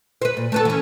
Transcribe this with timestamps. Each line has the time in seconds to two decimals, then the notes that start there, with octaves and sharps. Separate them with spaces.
0.22 B4 C5
0.37 A#2
0.52 A3 B3 A4
0.65 E3 C#4